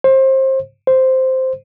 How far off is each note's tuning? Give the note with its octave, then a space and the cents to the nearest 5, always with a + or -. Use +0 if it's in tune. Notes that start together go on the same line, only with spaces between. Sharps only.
C5 +25
C5 -5